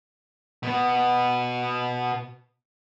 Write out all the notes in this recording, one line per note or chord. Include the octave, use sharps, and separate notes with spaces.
B2 B3